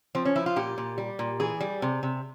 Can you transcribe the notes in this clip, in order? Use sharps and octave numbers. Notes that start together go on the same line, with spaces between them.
F3 C4
C#4
F3 E4
F4
A#2 G4
A#2
G3
A#2
E3 G#4
G3
C3
C3